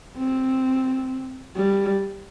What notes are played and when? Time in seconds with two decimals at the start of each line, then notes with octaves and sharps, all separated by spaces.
0.17 C4
1.57 G3